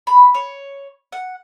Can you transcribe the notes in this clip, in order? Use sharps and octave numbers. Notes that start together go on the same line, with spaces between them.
B5
C#5
F#5